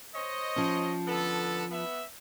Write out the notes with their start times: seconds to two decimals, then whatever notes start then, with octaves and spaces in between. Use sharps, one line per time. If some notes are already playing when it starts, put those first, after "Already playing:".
0.15 C5 C#5 D#5
0.56 F3 C#4
1.07 D3 B3 A4
1.71 B3 E5